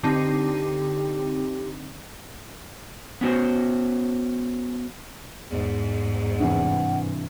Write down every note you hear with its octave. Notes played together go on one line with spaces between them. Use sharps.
D3 C4 D#4 G4
B3 C#4 F#4 C5
E2 G#2
G2 C3 E3 F#5